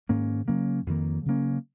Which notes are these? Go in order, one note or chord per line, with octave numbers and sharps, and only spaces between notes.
G#2 D#3 A#3 C#4
C#3 F#3 A#3 C#4
F2 D#3 A#3
C#3 F#3 A#3 C#4